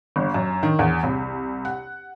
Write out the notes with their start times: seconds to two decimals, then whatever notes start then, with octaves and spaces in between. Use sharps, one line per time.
0.16 G1
0.34 F#2
0.63 D#3
0.79 E2
1.03 C2
1.65 F#5